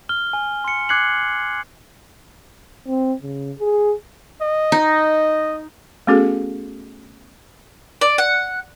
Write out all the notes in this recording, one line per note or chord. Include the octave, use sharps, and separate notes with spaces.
F6 G7
G#5
C6 C#7
D6 F#6 G#6 C7 C#7 F#7
C4
C#3
G#4
D#5
D#4
A3 B3 C#4 F#4 G#4 A4
D5
F#5